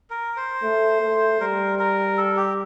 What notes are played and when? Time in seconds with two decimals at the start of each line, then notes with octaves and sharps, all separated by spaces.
0.10 A#4
0.37 C5
0.63 A3
1.01 A3
1.40 G3 A#4
1.79 A#4
2.18 A4
2.37 G4